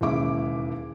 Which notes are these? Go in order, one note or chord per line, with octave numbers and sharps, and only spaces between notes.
E1 D#2 C#3 G#3 E4 D6